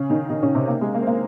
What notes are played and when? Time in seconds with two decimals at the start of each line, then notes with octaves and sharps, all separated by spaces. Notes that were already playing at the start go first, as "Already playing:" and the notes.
Already playing: C#3 C#4
0.09 D#3 D#4
0.29 D#3 D#4
0.43 C#3 C#4
0.55 C3 C4
0.68 A#3
0.81 G#3
0.94 A#3
1.02 C4
1.07 A#3